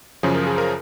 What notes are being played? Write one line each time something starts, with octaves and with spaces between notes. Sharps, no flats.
F#2 C#3 F3 G#4
A#4
G#4
A#4